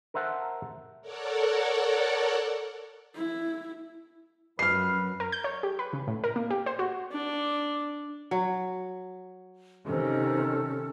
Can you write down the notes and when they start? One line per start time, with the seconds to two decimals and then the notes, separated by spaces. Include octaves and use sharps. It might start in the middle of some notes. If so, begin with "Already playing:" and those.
0.14 A#4 C5 E5 F#5 A5
1.02 A4 A#4 C#5 D5 F#5
3.15 E4
4.59 F#2 B4 F6 C7
5.20 A#4
5.32 G6
5.44 C#5
5.63 G4
5.79 B4
5.93 C#3
6.07 A2
6.24 A#4
6.36 A#3
6.50 G4
6.66 C5
6.79 F#4
7.12 D4
8.31 F#3
9.86 C3 D#3 C#4 A4